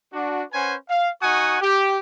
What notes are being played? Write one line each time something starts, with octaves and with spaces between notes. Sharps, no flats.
D4 F#4
C#4 B4 C5 F#5 G#5
F5
D#4 F#4 F#5 G#5 C#6 D#6
G4